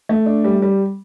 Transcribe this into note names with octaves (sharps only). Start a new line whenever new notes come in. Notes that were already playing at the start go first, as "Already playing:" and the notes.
A3
D4
G3
G3